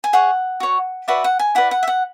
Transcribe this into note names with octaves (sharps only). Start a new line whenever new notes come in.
G#5
G#4 C#5 F#5
F#4 C#5
F#4 B4 D5 E5
F#5
G#5
E4 B4 D5 F#5
F#5
E5
F#5